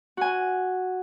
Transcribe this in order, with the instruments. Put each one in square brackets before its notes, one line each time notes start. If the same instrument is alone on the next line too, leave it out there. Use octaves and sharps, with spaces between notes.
[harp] F#4 G#5